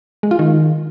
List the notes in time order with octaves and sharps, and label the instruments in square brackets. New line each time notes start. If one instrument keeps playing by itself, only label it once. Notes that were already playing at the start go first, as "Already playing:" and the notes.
[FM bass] G#3
F4
D#3